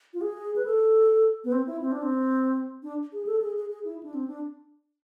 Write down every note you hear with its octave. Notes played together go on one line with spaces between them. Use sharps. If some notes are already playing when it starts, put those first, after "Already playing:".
F4
G#4
B4
A4
B3
C4
E4
C4
D4
C4
D4
G#4
A4
G#4
G#4
G#4
E4
D4
C4
D4